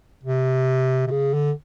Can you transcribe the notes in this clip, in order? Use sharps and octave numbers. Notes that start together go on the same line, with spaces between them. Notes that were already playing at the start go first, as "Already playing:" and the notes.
C3
C3
C#3
D3